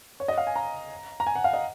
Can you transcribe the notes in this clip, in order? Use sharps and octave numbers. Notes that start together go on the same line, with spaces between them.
C#5
D#5
F5
G#5
A#5
A#5
G#5
F#5
F5
D#5